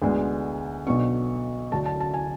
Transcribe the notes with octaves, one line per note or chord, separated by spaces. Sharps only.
D2 D3 G#3 B3
B1 B2 F#3 B3 D4 C#6
D2 D3 F#3 A5
A5
A5
G#5